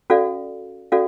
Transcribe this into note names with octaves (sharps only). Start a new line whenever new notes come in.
C#4 F#4 A4 D5 F5
C#4 F#4 A4 D5 F5